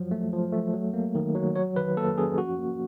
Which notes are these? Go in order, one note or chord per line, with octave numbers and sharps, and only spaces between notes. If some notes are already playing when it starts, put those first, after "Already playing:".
Already playing: F3 F#3
A3
F3
A3
F#3
A#3
D#3
F#3
F#3 C#5
D#3 B4
A#3 A4
C#4 G#4
F3 F#4
A#3